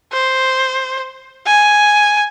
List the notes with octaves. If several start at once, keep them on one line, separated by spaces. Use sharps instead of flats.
C5
G#5